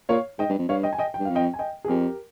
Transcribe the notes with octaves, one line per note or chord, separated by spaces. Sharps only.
A#2 C#5 F5
G#2 D#5 G5
G2
F2
G2 C#5 F5
D#5 G5
G#5
D#5 G5
G5
G2
F2 F5
D#5 G5
G#5
D#5 G5
G#4
F2 G4 A#4